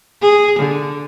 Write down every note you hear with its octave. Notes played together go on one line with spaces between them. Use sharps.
G#4
D3